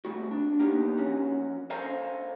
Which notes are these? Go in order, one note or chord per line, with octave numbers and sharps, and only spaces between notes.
C2 A3 F#4
D4
A#3 B3 D#4 G4
F3 C#4 F#4
A4 A#4 C5 F5 G#5 A#5